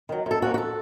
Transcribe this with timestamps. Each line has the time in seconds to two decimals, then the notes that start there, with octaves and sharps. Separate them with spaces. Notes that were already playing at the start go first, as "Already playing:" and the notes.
0.09 D#3 F#3
0.26 F#2 A4
0.42 F3 A#3 C#4 F#4
0.54 F#4
0.58 A4